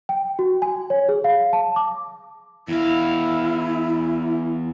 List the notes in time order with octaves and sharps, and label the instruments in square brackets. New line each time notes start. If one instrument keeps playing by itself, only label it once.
[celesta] G5
F#4
G#5
C#5
G#4
F5
A5
D6
[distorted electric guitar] E2 F5 [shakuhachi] E4